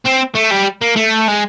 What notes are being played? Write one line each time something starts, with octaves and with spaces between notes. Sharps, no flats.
C4
A3
G3
A#3
A3
G#3